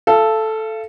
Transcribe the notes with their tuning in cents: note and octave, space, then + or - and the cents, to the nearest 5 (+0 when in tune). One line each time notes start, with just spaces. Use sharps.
A4 -5 F5 -40